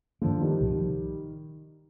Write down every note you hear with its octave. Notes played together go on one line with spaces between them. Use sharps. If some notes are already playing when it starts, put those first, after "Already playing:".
G2 D3 D#3 F3 A#3
D#3 G3
C2 A#2 F3